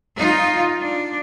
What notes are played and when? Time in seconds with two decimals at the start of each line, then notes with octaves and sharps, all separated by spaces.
0.17 D#4 F4
0.80 D4